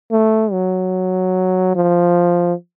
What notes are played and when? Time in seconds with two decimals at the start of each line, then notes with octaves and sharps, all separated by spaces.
0.11 A3
0.52 F#3
1.75 F3